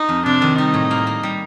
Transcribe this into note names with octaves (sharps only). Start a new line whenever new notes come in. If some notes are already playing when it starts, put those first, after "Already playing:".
Already playing: D#4
F2
C3 D4
D#3
G3 D#4
A2
A#3
A#3
G3